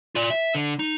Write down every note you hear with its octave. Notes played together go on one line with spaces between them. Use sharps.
F4 D5
E5
D3
D#4